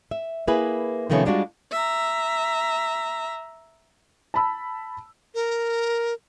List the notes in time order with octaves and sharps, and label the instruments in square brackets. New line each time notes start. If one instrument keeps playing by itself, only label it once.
[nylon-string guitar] E5
A#3 E4 G#4 B4
C3 D#3 F3 A3 B3 C#4
G3 G#3 D4 F4 F#4
[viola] E5 A#5
[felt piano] A5 B5 E6
[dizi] A#4